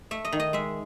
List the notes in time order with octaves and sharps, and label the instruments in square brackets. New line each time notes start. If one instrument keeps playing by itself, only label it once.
[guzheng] A3 E5
D#5
D#3
D#5
G#3 E5